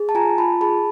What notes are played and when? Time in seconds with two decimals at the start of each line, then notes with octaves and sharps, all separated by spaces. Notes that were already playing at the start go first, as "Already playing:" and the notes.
Already playing: G#4
0.09 A5
0.15 F4 G#5 A#5
0.38 F4 A5 B5
0.61 G#4 A5 B5